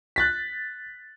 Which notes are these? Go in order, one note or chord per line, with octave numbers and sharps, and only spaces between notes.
F#6 A6 B6